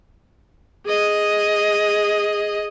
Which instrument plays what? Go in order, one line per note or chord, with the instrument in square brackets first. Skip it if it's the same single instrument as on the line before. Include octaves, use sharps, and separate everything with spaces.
[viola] G#4 D#5